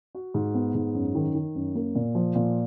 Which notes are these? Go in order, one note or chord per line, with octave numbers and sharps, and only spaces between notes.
F#4
G#2
B3
G#2
F#2
D#3
D#3
F#2
A#3
A#2
F3
A#2